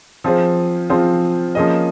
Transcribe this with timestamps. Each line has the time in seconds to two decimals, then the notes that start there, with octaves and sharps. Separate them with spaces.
0.24 F3 C4 F4 G#4 C5
0.90 F3 C4 F4 G#4 C5
1.55 F3 A#3 C#4 G#4 D#5